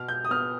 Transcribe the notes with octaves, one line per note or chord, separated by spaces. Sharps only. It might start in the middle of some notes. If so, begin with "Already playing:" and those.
Already playing: B2 F6
G6
D#6
B3 F6